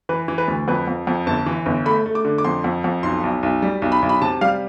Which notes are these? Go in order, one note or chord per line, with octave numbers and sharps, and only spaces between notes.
E3 B4
E3
B4
D2
F2 B4
F2
F2
G1 A5
E3
G1
A3 B5
A3
D6
D3
D6
F2 C6
F2
F2
B1 C6
B1
B1
G3
B1
B5
B1
B5
C3 A5
G3 F5